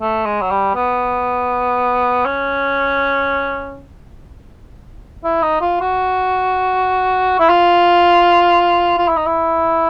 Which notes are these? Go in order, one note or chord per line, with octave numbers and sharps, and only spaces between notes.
A3
G#3
F#3
G3
B3
C#4
E4
D#4
F4
F#4
E4
F4
F4
E4
D#4
E4